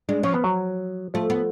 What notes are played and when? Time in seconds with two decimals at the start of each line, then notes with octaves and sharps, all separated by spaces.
0.09 G#3 D4
0.23 F3 C#4
0.34 B3
0.44 F#3
1.14 F3 A3
1.30 B3